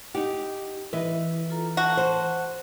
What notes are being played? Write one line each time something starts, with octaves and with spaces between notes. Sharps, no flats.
D#4 G4 F#5
E3 E4 B4 D#5 E5
F4 A4 A#5
F#4 A5
C5